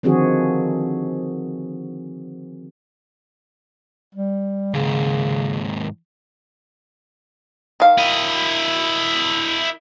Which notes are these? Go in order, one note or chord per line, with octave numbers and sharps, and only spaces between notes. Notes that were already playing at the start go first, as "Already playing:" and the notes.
D3 D#3 F3 C4 F#4 G#4
G3
D#2 G#2 C#3
D#3 F5
E4 D#5